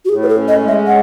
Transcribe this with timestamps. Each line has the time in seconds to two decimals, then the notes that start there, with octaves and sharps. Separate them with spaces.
0.05 F#4
0.09 A2 G#4
0.23 B4
0.29 A4
0.36 C#4
0.48 D#5
0.61 G#3
0.68 E5
0.87 F#5